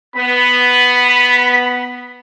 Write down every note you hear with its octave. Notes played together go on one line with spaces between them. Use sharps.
B3 B5